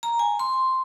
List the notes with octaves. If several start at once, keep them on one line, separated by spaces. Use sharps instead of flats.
A#5
G#5
C6